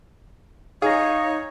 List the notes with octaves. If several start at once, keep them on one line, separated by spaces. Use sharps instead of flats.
D#4 G#4 C#5 F5 A#6